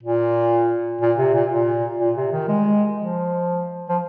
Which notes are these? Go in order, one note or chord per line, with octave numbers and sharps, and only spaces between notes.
A#2
A#2
C3
A#2
A#2
A#2
C3
D#3
G#3
F3
F3